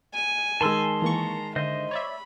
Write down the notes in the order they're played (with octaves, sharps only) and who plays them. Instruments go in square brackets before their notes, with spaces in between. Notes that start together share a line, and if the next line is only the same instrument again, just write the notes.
[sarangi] G#5
[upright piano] D#3 G#3 [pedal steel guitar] A5 C6 E6
[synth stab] E3 A#3 C#6 [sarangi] A#5
[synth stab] D3 [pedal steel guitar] C5 D#5 [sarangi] E5
[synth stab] C#5 D5 E5 [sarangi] B5